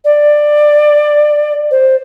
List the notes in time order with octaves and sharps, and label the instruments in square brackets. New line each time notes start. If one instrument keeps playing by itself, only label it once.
[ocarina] D5
C5